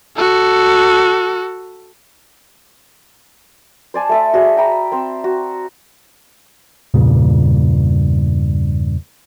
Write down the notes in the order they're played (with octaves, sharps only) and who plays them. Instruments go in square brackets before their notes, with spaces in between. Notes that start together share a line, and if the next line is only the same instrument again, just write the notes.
[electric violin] F#4 A4
[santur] C5 D5 G#5 A5
A3 A4 E5
F#4 G#4 D5
E5 G5 A#5 B5
C4 C5 E6
F#4
[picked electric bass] E2 G2 A#2 C#3